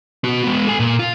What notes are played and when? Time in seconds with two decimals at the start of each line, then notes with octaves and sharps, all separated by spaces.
0.24 B3 F#4
0.44 G#3 B3
0.67 A4 G#5
0.80 A#2
0.99 F4